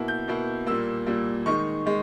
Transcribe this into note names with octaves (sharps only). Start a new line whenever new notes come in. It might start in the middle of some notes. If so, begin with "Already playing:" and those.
Already playing: B2 A#3 E4
G6
B2 A#3 E4
A#2 G3 A#3 E6
A#2 G3 A#3
D#3 G#3 D#4 C#6
D#3 G#3